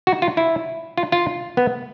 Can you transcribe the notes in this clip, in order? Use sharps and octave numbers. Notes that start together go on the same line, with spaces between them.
F#4
F4
E4
F4
F4
B3